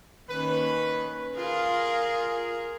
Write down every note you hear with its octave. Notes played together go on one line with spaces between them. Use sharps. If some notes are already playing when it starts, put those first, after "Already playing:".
D#3 A#3 C#4 B4
F4 G#4 A#4